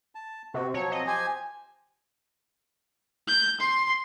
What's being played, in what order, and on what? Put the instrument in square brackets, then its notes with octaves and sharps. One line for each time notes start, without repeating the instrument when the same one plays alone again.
[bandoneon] A5
[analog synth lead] C3 [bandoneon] F#4
[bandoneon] B2 F3 F#3 [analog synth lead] C#5
[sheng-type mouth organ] C4 [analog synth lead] D#5
[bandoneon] F3 G4 C5 [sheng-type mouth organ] G#5
[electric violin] G6
C6